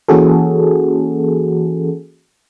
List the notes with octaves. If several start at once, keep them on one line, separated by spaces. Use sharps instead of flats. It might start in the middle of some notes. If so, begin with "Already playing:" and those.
E3 A#3 C#4 F#4 G#4 A4